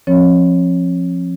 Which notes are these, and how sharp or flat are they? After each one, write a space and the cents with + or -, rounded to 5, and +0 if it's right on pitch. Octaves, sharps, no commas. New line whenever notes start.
F3 +5 C4 +45 C#5 +0